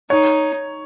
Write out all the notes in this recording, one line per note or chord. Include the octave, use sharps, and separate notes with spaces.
D#4 C#5